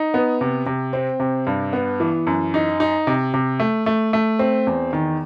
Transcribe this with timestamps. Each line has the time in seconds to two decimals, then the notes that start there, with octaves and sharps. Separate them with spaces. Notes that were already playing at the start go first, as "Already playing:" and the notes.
Already playing: D#4
0.14 B3
0.41 C3
0.66 C3
0.93 C4
1.20 C3
1.47 G2
1.73 B3
2.00 E3
2.27 F#2
2.54 D#4
2.80 D#4
3.07 C3
3.34 C3
3.60 A3
3.86 A3
4.13 A3
4.39 C4
4.67 E2
4.93 D#3